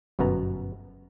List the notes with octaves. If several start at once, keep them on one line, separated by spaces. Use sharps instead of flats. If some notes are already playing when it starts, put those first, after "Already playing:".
G1 F#2 B2 B3 A#5